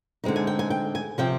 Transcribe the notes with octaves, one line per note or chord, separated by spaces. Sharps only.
D3 G#3 C4 D#4
G#5
G5
G#5
G5
G#5
C3 F3 C4 G5